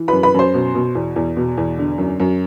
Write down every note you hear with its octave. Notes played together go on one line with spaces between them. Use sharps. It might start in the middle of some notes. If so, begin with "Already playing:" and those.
Already playing: E3
F#2 B4 B5
B4 B5
F#2 C5 C6
B2
B2
E2
E2
B2
E2
D3
F#2
F#2